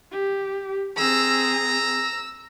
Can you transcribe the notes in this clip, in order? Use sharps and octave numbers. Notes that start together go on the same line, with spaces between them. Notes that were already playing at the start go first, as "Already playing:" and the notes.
G4
C4 G#4 A#5 E6
E6